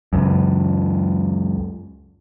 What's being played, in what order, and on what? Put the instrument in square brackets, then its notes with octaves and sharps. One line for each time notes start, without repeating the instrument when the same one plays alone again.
[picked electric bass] C#2 F#2